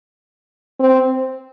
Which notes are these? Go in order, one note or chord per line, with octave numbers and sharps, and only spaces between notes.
C4